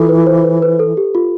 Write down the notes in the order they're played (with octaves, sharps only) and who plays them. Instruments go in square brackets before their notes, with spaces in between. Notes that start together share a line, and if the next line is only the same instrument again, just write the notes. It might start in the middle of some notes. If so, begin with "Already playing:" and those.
Already playing: [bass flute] E3 [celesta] E4 F4 A4
[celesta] B4
C5
B4
B4
A4
G4
F4